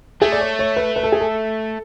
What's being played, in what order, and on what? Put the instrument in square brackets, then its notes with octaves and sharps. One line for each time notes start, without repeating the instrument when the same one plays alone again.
[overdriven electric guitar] A3 [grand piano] G#4
[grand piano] D5
C#5
C#5
B4
B4
A4
G#4
A4